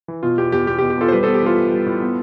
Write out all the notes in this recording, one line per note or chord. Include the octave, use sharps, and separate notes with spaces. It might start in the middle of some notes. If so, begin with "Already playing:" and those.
E3
B2 F4
E2 G4
E2 G4
E2 G4
G4
B2
G4
E2 F4 A4
C5
G3 G4 B4
B3 A4 C5
G4
E3 F4 A4
A2
G3
A2
B3